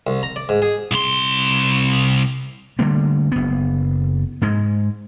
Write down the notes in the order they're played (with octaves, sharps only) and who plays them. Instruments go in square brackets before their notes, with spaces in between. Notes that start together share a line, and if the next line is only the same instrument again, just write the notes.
[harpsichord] C2
A#5
D5
G#2
G#4
[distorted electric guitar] C2 C6
[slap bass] D3 G3 A3 A#3
F#1 B3
G#2 G#3